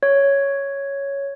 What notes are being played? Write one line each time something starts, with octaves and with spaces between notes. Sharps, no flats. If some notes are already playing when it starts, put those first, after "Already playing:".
C#5